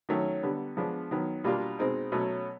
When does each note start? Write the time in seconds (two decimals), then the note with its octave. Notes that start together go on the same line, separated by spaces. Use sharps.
0.09 D#3 F#3 A3 C#4
0.43 D3 G3 B3
0.77 F3 G#3 B3 D4
1.11 D#3 F#3 B3
1.44 B2 G3 A#3 D4 F4
1.79 B2 G#3 C4 D#4
2.12 B2 F#3 A3 C#4